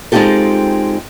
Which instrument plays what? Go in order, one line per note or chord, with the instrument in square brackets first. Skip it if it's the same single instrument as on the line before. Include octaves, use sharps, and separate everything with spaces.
[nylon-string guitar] G#3 C4 D#4 F4 G4 A4